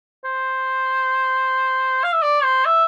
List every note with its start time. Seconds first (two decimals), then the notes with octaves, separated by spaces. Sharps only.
0.25 C5
2.04 F5
2.13 E5
2.23 D5
2.44 C5
2.66 E5